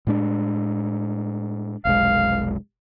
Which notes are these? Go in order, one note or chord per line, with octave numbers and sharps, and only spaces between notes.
A2 G#3 D4
F1 B1 G#3 F5